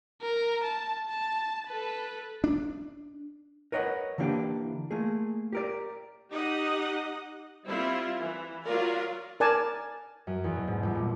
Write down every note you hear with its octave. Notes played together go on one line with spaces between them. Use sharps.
A#4
A5
A5
A4 B4
D4
A#4 B4 C#5 D#5 F5 F#5
D3 E3 A#3 D4 G4
A3 A#3 G#4
G4 A#4 D5
D#4 G4 D#5 F#5
G3 C4 E4 F4
E3
F#3 F4 A#4 D5
A#4 D5 G#5 A5
F#2
E2
B2
G#2
G1
A#2